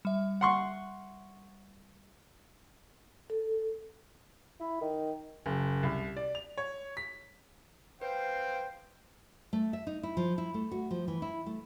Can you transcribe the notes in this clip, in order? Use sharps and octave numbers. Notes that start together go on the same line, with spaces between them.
G3 E5
F#5 C6 C#6
A4
E4
D#3
F#1
C2
D5
F7
C#5
B6
B4 C5 F5 G5
A3
E5
D#4
E4
F3
E4
A3
F#4
F3
E3
E4
A3